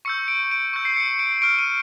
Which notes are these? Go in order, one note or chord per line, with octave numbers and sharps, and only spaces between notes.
C#6 E6 G6 C#7
D7
D7
C#6 E6 G6
C7
C#7
D7
C#6 F6 D7
D#7